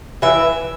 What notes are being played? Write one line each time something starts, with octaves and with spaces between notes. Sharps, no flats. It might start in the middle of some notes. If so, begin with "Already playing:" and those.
E3 E5